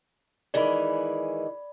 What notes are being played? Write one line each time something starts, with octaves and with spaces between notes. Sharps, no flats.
D#3 E3 G#3 D5 B5